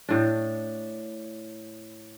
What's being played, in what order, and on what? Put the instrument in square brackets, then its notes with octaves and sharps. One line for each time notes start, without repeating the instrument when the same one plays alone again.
[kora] A2 D4